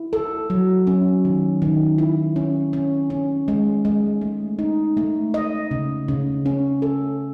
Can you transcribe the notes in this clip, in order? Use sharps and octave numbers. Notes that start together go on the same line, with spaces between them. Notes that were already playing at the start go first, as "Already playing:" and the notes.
Already playing: E4
A4
F#3
C#4
D#3
D#3
E4
C#4
C#4
C#4
G#3
G#3
A3
D#4
A3
D#5
C#3
C#3
C#4
A4